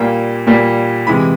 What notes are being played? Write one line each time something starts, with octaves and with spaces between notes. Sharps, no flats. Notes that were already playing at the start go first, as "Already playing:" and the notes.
Already playing: A#2 G3 A#3
A#2 G3 A#3
C3 E3 G#3 B5